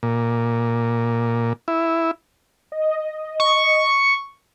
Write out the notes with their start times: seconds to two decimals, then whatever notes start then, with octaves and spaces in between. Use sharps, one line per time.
0.03 A#2
1.68 E4
2.72 D#5
3.40 C#6